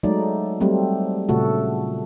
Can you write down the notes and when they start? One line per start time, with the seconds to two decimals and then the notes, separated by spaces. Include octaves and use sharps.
0.03 F#3 G#3 A3 D#4 D5
0.61 F#3 G3 A3 C4
1.29 A#2 C#3 A3 F#4 A4